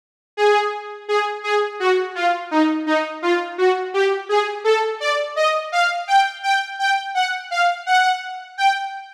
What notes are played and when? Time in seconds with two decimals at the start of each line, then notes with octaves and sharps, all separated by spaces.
0.37 G#4
1.08 G#4
1.44 G#4
1.80 F#4
2.15 F4
2.51 D#4
2.86 D#4
3.22 F4
3.58 F#4
3.94 G4
4.29 G#4
4.64 A4
5.00 D5
5.36 D#5
5.72 F5
6.08 G5
6.43 G5
6.79 G5
7.15 F#5
7.51 F5
7.86 F#5
8.58 G5